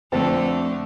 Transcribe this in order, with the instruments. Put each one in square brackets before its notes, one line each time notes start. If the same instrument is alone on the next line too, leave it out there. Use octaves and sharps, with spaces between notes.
[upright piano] F2 C5 A5 [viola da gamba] D3 A3